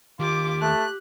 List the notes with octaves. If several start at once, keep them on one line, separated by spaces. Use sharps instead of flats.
D#2 F4 G4 D6
A3 F#6